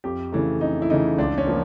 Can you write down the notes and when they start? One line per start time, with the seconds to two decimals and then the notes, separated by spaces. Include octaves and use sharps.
0.04 F2 G4
0.32 C#3 E3 A3
0.61 F2 D#4
0.82 E4
0.90 C#3 E3 A3 D#4
1.18 C#2 D4
1.38 C#4
1.47 F3 A#3